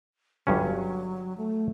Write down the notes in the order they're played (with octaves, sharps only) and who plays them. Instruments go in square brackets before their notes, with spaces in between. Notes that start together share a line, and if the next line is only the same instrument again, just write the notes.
[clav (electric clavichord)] G1 G2 C#4 [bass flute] F#3
[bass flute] A3